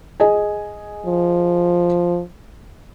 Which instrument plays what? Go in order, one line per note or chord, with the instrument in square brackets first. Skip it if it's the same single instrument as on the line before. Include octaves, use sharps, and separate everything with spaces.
[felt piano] G#4 D#5 G#5
[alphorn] F3